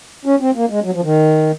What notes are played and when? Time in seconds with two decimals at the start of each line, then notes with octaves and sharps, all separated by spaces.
0.25 C#4
0.40 C4
0.55 A#3
0.70 G#3
0.84 F#3
0.94 F3
1.04 D#3